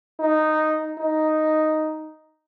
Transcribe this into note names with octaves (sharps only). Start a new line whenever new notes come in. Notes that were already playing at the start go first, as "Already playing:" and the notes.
D#4
D#4